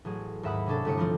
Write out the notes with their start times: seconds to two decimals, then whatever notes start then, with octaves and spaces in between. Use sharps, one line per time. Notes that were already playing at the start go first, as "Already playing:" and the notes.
0.05 A1 F#3 G#4
0.43 D#2 G#2 E5 F#5 B5 D#6
0.66 C3 C#4 D4 A4
0.85 G1 A3 E4 D#6 C#7
0.97 E3 F3 G3 C4 F4